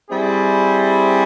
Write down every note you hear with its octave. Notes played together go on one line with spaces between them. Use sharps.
G3 C4 E4 G#4